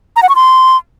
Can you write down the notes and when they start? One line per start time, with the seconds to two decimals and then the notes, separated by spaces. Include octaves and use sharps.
0.16 A#5
0.23 F#5
0.29 C#6
0.35 C6